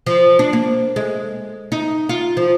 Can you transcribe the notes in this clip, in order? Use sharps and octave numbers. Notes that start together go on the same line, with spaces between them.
F3
D4
A#3
G#3
D#4
F4
F3